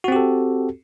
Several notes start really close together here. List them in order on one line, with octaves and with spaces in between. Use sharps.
F#4 C4 G4 A4